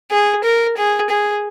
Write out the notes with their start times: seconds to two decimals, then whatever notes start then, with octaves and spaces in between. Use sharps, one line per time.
0.11 G#4
0.44 A#4
0.77 G#4
1.10 G#4